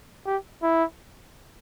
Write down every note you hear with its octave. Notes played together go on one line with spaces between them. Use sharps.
G4
E4